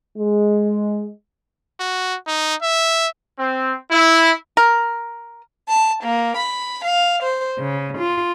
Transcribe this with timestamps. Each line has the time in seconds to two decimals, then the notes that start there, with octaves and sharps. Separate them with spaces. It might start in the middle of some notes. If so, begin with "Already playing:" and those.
0.18 G#3
1.80 F#4
2.28 D#4
2.63 E5
3.37 C4
3.91 E4
4.57 A#4
5.67 A5
6.02 A#3
6.36 B5
6.83 F5
7.22 C5
7.58 C#3
7.98 F4